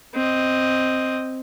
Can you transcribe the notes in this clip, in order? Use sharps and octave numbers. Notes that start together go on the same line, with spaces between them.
C4 D#5